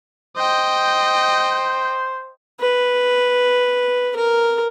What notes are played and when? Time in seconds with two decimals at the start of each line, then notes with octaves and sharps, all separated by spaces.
0.37 C5 D#5 G5
2.61 B4
4.16 A#4